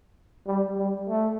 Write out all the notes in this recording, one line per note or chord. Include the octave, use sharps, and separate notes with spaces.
G3
G3
A3